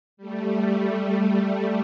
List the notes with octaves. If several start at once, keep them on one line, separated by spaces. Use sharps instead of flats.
G3 A3